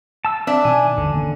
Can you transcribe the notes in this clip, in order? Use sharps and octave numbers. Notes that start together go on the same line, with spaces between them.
A5 E6
C4 D4 E5
B2 D#3 G#5
G1 D#2 D3 E3
E1 A#3 C#4